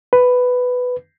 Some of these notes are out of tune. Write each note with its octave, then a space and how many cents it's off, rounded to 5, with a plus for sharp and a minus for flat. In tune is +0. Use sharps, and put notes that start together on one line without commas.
B4 +10